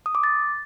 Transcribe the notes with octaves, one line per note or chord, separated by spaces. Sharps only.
D#6
D6
A6